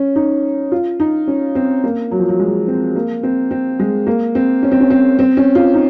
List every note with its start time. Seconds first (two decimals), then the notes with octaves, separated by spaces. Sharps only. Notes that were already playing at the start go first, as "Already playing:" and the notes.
Already playing: C#4
0.16 D#4
0.72 F4
1.00 D#4
1.28 C#4
1.55 C4
1.84 A#3
2.11 F#3
2.19 F3
2.29 F#3
2.39 G#3
2.68 C4
2.95 A#3
3.23 C4
3.51 C4
3.79 G#3
4.07 A#3
4.35 C4
4.63 C#4
4.72 C4
4.81 C#4
4.90 C4
5.19 C4
5.37 C#4
5.55 F4
5.74 D#4